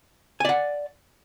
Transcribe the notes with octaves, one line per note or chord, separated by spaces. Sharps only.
D5 F#5 G#5